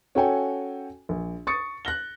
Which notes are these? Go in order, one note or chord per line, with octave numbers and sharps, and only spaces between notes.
C#4 F#4 A4 G5 G#5
A#1
C#6 D#6 A6 C#7
F#6 A#6 G7